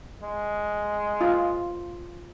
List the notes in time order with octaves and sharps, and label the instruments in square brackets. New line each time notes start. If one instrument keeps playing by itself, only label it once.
[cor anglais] G#3
[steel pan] F4